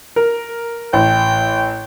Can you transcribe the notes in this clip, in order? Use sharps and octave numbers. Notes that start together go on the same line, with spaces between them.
A#4
A1 G5